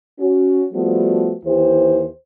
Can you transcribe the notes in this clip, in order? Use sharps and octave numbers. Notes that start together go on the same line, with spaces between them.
C#4 F#4
F3 G3 A3 B3 F#4
D#2 E3 G4 C5